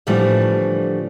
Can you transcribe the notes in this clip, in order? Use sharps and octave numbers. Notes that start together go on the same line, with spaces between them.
A2 D3 E3 F3 G3 A3